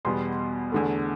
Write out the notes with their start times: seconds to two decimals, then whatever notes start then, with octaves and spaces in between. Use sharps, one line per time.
0.05 E2 B2 G3 B3 C6
0.72 E2 D3 A3